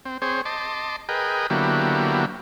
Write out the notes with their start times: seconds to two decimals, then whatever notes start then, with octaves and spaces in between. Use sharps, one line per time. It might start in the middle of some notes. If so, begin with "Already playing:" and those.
0.05 C4
0.22 C4 G#4 C5 C#5
0.45 D#5 A5 C6 D6
1.09 G#4 A#4 B4 D#5 G5
1.50 D3 F#3 A#3 B3 E4 G4